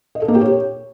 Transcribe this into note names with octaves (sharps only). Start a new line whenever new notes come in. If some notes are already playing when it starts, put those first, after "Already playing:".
D#5
A4
A#3
G4
C#5